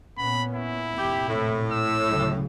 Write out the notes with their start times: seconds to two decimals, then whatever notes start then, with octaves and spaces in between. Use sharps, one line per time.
0.18 A#2 B3 C#4 B5
0.54 E4
0.98 F1 A#2 C4 G4
1.29 A2
1.72 E6
2.09 D2 C#3 F#3